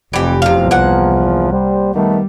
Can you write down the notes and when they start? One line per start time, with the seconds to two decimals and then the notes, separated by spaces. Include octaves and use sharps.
0.13 F1 F2 E3 G4
0.42 E2 C3 F3 F5
0.71 C2 A#3 F#5
1.52 G3 C5
1.94 D#3 G3 A3 B3